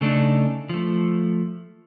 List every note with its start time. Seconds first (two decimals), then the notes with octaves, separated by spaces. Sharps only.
0.01 C#3 A3 D4 D#4
0.69 F3 A3